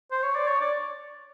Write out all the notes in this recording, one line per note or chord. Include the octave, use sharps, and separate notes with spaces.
C5
C#5
D5
C#5
D5